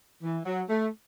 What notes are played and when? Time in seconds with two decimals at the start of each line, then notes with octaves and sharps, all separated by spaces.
0.22 E3
0.45 F#3
0.69 A3